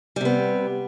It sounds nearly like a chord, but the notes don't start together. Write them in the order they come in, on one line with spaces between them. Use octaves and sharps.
G3 C3 B3